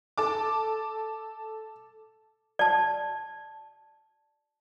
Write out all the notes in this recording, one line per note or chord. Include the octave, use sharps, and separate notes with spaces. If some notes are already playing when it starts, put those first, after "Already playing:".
A4 A5 D6
D5 A5